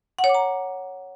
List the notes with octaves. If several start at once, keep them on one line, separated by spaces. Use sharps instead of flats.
F#5
C#5
D6
A#5